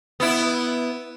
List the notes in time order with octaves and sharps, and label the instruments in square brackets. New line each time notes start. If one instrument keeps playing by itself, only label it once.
[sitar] B3 E4